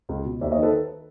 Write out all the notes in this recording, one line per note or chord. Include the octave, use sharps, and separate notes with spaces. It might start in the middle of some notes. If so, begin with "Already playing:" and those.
C#2
B2
D#2 D5 E5
C#5 D#5
D#3
A4 B4